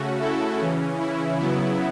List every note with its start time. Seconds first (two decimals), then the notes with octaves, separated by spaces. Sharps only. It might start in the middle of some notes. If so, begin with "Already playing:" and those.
Already playing: C#3 A3 C#4 F#4
0.20 E4 A4
0.59 C#3 E3 C#4
0.99 E4
1.39 C#3 F#3 B3 E4